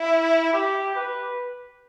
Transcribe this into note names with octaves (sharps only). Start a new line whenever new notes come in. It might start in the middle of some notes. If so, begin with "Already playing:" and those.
Already playing: E4
G4
B4